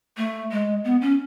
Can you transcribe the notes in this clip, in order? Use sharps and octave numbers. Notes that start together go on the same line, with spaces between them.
A3
G#3
B3
C#4